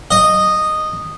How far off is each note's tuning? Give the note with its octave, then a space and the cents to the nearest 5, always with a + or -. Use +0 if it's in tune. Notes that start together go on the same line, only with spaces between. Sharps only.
D#5 -10